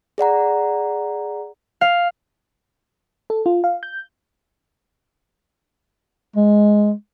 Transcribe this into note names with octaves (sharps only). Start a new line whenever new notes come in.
G#4 D5 F#5 A#5
F5
A4
F4
F5
G6
G#3